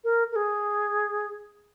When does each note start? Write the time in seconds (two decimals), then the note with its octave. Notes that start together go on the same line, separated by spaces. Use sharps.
0.04 A#4
0.32 A#4
0.36 G#4